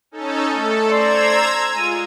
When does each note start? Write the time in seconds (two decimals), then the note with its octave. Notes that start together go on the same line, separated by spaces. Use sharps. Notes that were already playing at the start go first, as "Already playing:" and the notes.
0.11 C#4 D#4 A4
0.49 A3 A4
0.89 C5 D5 A#5 E6 G#6
1.74 G#3 F4 G#5